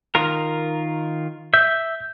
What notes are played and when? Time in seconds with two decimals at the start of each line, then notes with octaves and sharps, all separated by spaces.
0.15 D#3 F4 A#4
1.54 E5 G6